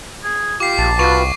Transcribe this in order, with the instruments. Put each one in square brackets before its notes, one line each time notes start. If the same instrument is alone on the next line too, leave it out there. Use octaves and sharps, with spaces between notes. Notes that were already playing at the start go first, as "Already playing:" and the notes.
[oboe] G#4
[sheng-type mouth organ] F4 G4 [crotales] D6 C7
[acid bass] A#1 [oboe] A5
[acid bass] C2 [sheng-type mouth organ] F4 F#4 B4 [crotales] C#6